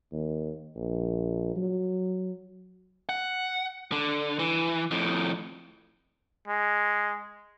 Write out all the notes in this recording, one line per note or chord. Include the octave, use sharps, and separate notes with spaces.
D#2
A#1
F#3
F#5
D3
E3
F2 A2
G#3